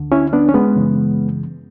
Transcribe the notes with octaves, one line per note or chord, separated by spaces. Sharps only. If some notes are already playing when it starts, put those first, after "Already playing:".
Already playing: D2 D3
C#4 E4
B3 D4
C#4
G#3 B3
F#2 C#3 E3